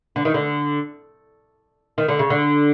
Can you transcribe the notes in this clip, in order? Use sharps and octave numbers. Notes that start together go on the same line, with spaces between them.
D3
D#3
D3
D#3
D3
C#3
D3